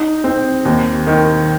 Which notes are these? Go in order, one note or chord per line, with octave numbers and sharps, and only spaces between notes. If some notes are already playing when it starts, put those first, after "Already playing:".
Already playing: D#4
C4
D#2
D#3